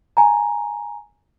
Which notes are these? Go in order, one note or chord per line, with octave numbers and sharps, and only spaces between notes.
G#5 A#5